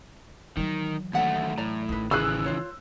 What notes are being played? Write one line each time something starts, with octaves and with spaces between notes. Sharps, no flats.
D#3 E3 F#3
D#2 A3 C#4 E5 F#5
A2 D5 A#5
A1 D#3 D#4 B4
C#3 E3 G#4 G#5 B5 E6 F#6
F4 C5 C#5